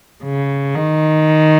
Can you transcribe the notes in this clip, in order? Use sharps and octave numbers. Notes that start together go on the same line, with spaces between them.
C#3
D#3